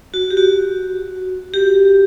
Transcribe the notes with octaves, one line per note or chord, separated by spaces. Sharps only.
F#4
G4
F#4
G4